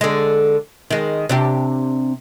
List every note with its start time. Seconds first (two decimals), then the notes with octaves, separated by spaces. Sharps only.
0.01 D3 G#3
0.91 D#3 G#3
1.29 C3 D4 G4